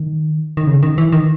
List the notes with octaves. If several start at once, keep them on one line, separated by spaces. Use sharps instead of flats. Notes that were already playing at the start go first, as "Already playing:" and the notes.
Already playing: D#3
D#3
C#3
D#3
E3
D#3